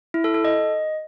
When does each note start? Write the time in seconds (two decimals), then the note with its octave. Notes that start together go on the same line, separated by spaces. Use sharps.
0.14 E4
0.24 A4
0.34 A4
0.44 D#5